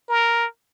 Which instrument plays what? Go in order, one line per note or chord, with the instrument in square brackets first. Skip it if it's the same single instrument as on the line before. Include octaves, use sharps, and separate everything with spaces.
[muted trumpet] A#4